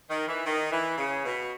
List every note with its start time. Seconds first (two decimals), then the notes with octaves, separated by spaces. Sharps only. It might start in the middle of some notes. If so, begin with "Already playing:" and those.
0.10 D#3
0.27 E3
0.45 D#3
0.71 E3
0.97 C#3
1.24 B2